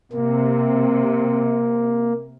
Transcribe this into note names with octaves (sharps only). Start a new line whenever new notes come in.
C3 A#3